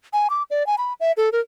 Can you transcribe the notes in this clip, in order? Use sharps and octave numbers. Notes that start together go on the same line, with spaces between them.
G#5
D6
D5
G#5
B5
E5
A4
A#4